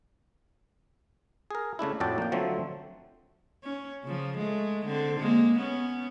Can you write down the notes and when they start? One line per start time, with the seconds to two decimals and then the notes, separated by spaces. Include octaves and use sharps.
1.51 G#4 A#4
1.79 C#3 A3 D4 E4
2.00 F2 A2 F#4 D5 G5 A5
2.18 A#3 G5
2.32 D3 F3 F#3 A3 C4
3.64 C#4
4.04 C#3 F3
4.38 G#3 A3
4.86 D3 C4
5.20 G#3 A#3
5.57 B3 C#4